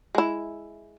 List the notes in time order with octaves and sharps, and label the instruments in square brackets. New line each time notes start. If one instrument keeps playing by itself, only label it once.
[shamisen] G#3 E4